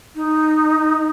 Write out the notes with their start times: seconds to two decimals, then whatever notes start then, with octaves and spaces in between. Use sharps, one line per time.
0.15 D#4